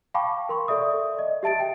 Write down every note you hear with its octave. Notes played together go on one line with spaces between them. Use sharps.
F5 G5 A5 B5 C#6 D6
A#4 C6 C#6
A4 D5 E5 D#6
D5 D#5
G4 E5 A5 A6 D7
G5